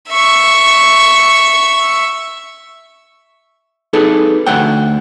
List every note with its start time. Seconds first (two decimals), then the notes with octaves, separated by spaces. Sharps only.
0.11 E5 C#6
3.93 D#4 G#4 A4 B4
4.47 D2 A3 F#5 G5